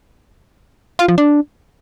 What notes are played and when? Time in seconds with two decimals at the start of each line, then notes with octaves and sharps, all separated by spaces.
0.99 F4
1.08 F3
1.18 D4